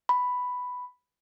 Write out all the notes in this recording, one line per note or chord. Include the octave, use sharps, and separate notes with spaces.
B5